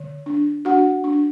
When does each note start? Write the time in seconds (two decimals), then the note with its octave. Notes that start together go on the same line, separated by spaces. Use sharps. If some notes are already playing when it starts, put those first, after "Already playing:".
Already playing: D3
0.26 D4
0.65 D4 F#4 F#5
1.04 D4